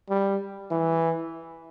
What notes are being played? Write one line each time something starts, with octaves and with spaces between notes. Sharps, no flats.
G3
E3